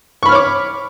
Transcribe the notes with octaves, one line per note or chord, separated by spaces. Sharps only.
C#5 B5 C#6 D6 F6